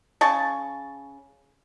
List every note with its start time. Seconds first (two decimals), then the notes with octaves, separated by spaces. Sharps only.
0.21 C#3 A5 C#6